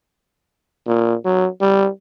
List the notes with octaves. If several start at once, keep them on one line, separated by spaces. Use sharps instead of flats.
A#2
F#3
G3